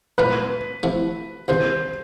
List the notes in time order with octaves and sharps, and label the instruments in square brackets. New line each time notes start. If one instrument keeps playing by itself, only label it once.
[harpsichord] A#2 F#3 A3 D4 F4 [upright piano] B4
[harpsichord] C3 F3 A3 C4 E4
[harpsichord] C2 C3 D#3 G3 [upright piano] C5